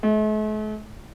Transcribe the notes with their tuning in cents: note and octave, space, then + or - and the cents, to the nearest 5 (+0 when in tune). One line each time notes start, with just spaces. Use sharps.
A3 -45